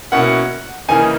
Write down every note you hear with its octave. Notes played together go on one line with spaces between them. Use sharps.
B2 A#3 C#4 E4 F#5
C#3 E3 A#3 D#4 G#5